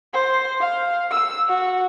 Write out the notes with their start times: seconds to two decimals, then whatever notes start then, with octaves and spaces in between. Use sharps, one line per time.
0.14 C5
0.61 F5
1.11 E6
1.48 F#4